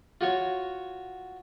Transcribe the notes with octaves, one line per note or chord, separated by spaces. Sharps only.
F4 F#4 C#5